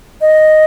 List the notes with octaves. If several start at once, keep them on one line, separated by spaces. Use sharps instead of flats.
D#5